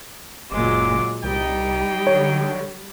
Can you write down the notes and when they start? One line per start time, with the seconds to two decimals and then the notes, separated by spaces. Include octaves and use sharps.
0.52 F#1 A#2 F#3 G#3 D6
1.24 C2 G3 D#4 G5
2.07 D3 C#5